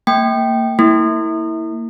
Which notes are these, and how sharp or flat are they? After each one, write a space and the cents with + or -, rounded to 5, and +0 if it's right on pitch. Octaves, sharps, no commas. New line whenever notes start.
A#3 -30 G5 -10
A#3 -20 E4 -20